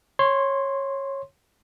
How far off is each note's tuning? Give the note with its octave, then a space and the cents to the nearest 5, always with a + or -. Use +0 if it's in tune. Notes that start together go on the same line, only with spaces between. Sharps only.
C#5 -15 C6 +0